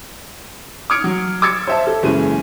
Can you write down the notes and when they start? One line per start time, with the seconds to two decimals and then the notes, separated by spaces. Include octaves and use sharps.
0.90 D6 D#6 F6 G#6 C#7 D7
1.04 F#3
1.42 D6 E6 G#6 A6 C#7
1.67 C5 E5 A5
1.87 A4
2.03 F#1 C#3 E3 G#3 D#7